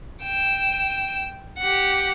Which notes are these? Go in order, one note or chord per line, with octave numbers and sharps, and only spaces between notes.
G5 E7
G4 F#5